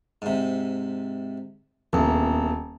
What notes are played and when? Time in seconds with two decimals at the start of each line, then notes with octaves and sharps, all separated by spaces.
0.22 G#2 C3
1.93 D#1 A#1 E2